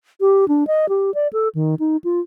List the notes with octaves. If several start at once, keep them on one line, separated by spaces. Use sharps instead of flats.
G4
D4
D#5
G4
D5
A4
D#3
D#4
F4